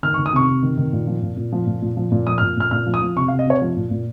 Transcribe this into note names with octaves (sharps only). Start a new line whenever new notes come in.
D#3 F6
C#6
D#3
D#6
C3 C#6
C3
D#3
D#3
A#2
F3
A#2
A#2
F3
A#2
A#2
F3
A#2
F3 D#6
F6
A#2
A#2 F6
A#2 F6
F3
D#6
F3
C3 C#6
F5
C3
D#5
C3 C#5
F3
A#2
A#2